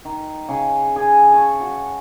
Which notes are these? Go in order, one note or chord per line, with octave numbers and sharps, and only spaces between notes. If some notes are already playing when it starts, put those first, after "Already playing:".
D#3
C#3
G#4 G#5
A5 C#6
F#4